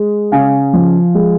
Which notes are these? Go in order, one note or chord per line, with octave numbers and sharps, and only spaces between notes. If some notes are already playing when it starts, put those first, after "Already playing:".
Already playing: G#3
C#3 F5 G#5
F3
G#3